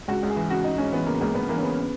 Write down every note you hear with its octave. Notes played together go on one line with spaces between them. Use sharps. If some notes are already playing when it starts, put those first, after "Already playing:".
C#2 F#4
C#2
G#4
E3
C#3 F#4
C#2 D#4
C#2 C#4
E3 B3
C#3 A#3
C#2 A#3
C#2 B3
E3 A#3
C#4
C#3 B3